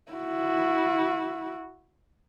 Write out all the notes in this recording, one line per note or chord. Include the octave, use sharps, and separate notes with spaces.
E4 F#4